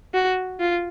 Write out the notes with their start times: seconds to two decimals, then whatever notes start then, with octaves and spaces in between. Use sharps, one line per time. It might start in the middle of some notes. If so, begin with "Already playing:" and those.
0.14 F#4
0.60 F4